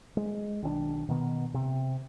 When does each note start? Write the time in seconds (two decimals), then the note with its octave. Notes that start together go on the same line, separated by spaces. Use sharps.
0.17 G#3
0.62 B1 D#3 C#4 D4
1.09 B2 D#3 B3
1.54 C3